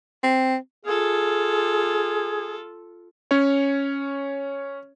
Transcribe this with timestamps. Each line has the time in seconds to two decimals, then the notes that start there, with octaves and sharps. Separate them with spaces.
0.23 C4
0.85 F4 G#4 A4
3.31 C#4 C#5